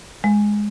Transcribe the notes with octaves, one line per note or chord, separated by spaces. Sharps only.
G#3